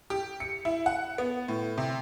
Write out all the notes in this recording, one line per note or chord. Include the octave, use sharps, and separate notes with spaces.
G4
C#7
E4
F#5
B3
A2
C3